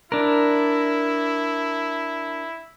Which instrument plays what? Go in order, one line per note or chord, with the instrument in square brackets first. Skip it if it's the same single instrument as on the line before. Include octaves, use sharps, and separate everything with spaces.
[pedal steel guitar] D4 A#4 [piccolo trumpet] E4